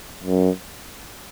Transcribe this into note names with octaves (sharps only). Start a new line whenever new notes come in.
F#2